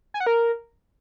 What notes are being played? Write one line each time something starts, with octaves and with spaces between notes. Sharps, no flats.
G#5
F#5
A#4